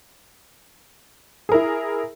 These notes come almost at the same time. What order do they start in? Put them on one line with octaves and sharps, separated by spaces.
G#4 A#4 E4